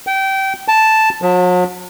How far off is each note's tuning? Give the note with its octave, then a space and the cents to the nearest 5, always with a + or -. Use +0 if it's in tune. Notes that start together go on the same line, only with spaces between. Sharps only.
G5 -25
A5 +0
F#3 -45